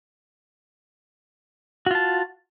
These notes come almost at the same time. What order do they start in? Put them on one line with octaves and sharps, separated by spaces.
F#4 F4 A5